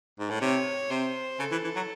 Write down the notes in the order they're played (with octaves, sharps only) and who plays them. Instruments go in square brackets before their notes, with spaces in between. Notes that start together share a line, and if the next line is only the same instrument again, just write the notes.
[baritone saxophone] G#2
A2
[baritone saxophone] C3 [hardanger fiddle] C#5
[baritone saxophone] C3 [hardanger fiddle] C5
[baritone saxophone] C#3 [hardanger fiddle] A4
[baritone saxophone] E3
E3
F#3